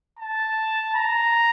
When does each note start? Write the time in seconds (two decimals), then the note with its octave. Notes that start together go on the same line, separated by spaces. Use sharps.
0.19 A5
0.95 A#5